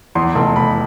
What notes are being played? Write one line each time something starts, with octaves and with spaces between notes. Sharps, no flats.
E2 C6
F1 C6
F1 B5